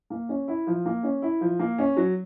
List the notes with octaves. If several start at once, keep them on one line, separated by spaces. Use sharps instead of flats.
A#3
C#4
E4
F3
A#3
C#4
E4
F3
A#3
C#4
F#3